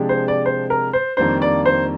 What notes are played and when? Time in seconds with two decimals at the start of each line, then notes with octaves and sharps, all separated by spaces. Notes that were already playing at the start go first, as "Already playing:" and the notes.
Already playing: C3 F3 G#3 D4 G4
0.09 C5
0.28 D5
0.46 C5
0.70 A#4
0.93 C5
1.17 F2 D#3 G3 A#3 D4 C5
1.42 D5
1.66 C5